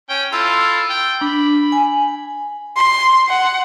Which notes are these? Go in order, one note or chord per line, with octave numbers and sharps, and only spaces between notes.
C#4 G5
E4 F4 A4 E6
G5
D4 B5
G#5
C6
F#5